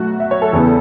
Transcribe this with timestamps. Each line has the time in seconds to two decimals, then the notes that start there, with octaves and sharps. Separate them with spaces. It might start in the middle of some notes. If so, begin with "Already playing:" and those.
Already playing: B1 A3 F#4
0.20 E5
0.31 C#5
0.42 A4
0.53 E2 C#3 E3 B3